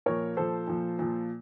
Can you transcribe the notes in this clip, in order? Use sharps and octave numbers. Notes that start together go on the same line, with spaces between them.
A#2 F3 A#4 C#5
A#2 F3 A4 C5
A#2 F3
A#2 F3